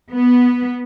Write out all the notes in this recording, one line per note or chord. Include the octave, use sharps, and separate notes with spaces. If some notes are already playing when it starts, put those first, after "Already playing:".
B3